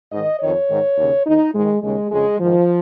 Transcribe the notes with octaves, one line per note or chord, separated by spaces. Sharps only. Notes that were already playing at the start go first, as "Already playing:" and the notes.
G#2 D#3 D#5
F2 D#3 C#5
G#2 D#3
D#2 C#3
D#2 D#3 D#4
G#2 D#3 G#3
D#2 C#3 G#3
F2 C#3 G#3
G#2 D#3 F3